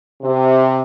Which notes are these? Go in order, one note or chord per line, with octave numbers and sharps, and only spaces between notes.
C3